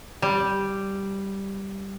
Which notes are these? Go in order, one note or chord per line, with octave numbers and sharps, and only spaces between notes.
G3